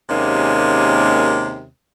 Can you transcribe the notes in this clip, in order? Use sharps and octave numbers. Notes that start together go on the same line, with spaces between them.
D#2 C3 G#3 A#3 C#4